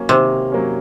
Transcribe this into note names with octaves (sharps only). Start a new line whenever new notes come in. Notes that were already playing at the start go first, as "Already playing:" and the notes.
Already playing: F#3 A#3 C#4
C3 D#3
F#3 A#3 C#4